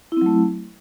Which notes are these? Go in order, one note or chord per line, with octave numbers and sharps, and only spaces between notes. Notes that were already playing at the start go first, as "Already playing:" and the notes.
F#3 A3 C4 E4